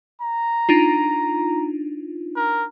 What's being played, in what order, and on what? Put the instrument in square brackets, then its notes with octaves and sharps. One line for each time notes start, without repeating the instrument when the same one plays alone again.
[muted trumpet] A#5
[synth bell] D4 D#4 F4
[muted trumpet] A#4